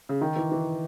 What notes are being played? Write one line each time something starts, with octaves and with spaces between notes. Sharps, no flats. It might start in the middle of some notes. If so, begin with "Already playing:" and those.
C#3
D#3
E3
E3